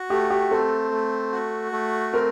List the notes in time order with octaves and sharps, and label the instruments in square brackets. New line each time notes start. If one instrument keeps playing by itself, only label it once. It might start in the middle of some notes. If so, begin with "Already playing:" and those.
Already playing: [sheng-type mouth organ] F#4
[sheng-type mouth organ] A3 [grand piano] G4
[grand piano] G4
[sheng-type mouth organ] C4 [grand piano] A4
[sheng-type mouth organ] A3
F#4
A3
[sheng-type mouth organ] C4 [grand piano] A#4